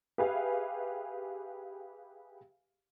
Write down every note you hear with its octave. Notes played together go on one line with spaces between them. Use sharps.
G4 G#4 B4 E5 F5 G#5